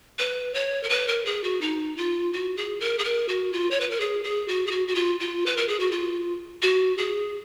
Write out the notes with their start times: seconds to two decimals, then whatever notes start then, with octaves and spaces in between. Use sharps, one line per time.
0.19 B4
0.54 C#5
0.83 A#4
0.90 B4
1.08 A#4
1.25 G#4
1.44 F#4
1.61 D#4
1.97 F4
2.33 F#4
2.57 G#4
2.80 A#4
2.98 G#4
3.05 A#4
3.29 F#4
3.53 F4
3.71 C#5
3.81 B4
3.91 A#4
4.00 G#4
4.24 G#4
4.48 F#4
4.67 G#4
4.71 F#4
4.88 F#4
4.95 F4
5.20 F4
5.46 B4
5.57 A#4
5.68 G#4
5.80 F#4
5.91 F4
6.62 F#4
6.98 G#4